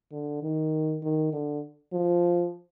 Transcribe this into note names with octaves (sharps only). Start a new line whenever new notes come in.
D3
D#3
D#3
D3
F3